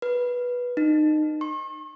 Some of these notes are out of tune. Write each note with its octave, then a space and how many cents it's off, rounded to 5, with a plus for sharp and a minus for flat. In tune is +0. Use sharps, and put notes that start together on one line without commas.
B4 -10
D#4 -25
C#6 -45